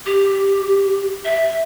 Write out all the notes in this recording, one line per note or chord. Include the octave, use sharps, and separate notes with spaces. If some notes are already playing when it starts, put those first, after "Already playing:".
G4
E5